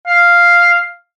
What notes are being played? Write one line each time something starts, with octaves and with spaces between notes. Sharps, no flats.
F5